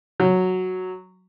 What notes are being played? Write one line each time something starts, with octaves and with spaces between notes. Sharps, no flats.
F#3